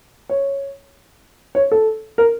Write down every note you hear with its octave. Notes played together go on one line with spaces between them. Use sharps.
C#5
C#5
A4
A#4